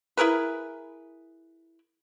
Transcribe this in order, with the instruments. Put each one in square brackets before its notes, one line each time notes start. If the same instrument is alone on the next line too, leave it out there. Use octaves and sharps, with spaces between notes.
[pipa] E4 G#4 A#4 B4